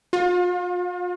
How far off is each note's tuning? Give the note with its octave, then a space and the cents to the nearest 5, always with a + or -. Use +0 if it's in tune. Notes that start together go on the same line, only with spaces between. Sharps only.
F4 +40